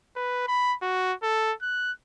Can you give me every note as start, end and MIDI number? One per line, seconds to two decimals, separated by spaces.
0.16 0.44 71
0.48 0.75 83
0.82 1.14 66
1.23 1.53 69
1.63 1.92 90